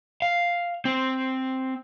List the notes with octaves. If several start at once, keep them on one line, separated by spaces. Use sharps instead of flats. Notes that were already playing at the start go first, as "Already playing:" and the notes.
F5
C4